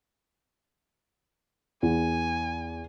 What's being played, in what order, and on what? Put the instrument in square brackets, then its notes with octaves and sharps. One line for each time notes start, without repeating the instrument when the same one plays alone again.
[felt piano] E2 [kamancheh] G#5